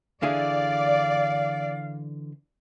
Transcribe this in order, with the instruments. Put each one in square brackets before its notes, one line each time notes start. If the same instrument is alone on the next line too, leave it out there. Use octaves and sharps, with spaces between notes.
[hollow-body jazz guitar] D3 E3 G#4 [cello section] D5 [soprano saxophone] F5